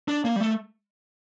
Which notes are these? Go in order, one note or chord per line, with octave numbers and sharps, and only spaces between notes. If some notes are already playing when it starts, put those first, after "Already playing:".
D4
A#3
G3
A3